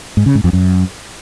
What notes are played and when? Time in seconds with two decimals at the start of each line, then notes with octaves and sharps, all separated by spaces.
0.17 G#2
0.26 C#3
0.35 G#2
0.44 F2
0.53 F#2